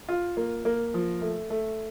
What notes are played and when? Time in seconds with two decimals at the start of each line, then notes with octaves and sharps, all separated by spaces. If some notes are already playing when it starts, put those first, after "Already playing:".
0.08 F4
0.37 A#3
0.65 A#3
0.94 F3
1.21 A3
1.50 A3